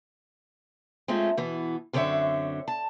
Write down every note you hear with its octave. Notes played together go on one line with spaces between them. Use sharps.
G#3 A3 C4 C#4 F4
B2 E3 B3
F#2 D3 C4 A4 C#5 E5
A5